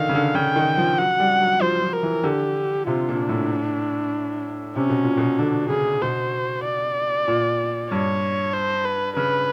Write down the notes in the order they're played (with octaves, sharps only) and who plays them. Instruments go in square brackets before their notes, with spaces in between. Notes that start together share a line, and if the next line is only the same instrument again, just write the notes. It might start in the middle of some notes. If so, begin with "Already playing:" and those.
Already playing: [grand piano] D3 D#3 [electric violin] F5
[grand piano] C#3
D3
[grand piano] C#3 [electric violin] G5
[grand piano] D#3
F3
[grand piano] F#3 [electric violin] F#5
[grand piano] G3
F#3
[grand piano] F3 [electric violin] C5
[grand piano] F3
[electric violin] A#4
[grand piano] E3
[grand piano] D3 [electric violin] G4
[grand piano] C3 [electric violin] F4
[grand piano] A#2
[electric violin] D4
[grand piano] A2
[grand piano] C3 [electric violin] C#4
[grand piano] B2
A#2
B2
[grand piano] D3 [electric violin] D4
[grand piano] C#3 [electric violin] G#4
[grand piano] B2 [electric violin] C5
[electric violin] D5
[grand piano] A#2
[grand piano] G2 [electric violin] C#5
[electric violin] C5
B4
[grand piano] C#3 [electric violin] B4